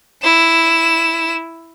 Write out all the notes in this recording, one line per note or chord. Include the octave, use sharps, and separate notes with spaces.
E4 E7